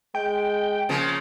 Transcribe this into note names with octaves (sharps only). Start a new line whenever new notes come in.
G#3 G5
C#3 F3 A#3